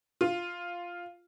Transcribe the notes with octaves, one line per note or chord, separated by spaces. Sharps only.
F4